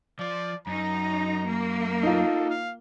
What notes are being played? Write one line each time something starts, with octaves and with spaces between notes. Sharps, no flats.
F3 D5
F#2 D#4 A#5
A#3
D#4 F4 A4
F5